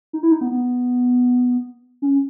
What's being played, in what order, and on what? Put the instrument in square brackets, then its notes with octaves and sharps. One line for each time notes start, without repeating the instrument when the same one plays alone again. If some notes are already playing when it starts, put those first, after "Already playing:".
[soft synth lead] D#4
E4
D#4
B3
B3
C#4